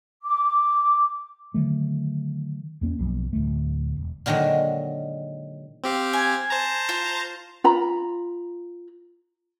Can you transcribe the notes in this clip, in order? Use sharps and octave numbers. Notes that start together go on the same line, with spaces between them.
D6
D3 D#3 F#3 A3
E2 A#3 C#4
B1 F#2 F3
D1 D2 A3
E1
A#2 D3 D#3 F#3 G#3
C4 G4 F5
G#5
C5 A5 A#5
F4
F4 A#5 B5